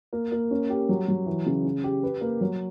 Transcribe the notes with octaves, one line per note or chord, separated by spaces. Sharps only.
A#3
A#3
C#4
G4
F#3
F#3
E3
C#3
C#4
G4
B4
A#3
F#3